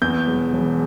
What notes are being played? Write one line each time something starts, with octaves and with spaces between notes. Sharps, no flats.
E2 G6
E1
E1